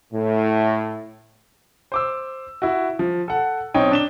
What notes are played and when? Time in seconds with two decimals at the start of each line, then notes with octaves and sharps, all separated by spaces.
0.13 A2
1.92 C5 D6 E6
2.62 E4 F#4
2.99 F3
3.28 A4 F#5
3.74 B1 C4 D#4 C#5 G5
3.92 D4 E7 G7